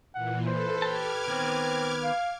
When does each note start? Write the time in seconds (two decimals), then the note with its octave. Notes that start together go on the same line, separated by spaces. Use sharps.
0.15 A#2 E3 F#5
0.46 A4 B4 C5
0.82 G4 A5 D6 F6 G#6
1.28 D#3 B3 C4
2.03 F5